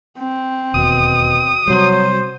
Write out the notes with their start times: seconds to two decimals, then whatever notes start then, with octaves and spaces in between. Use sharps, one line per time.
0.18 C4
0.74 E1 D#2 B2 D#6
1.68 C3 F#3 G3 C5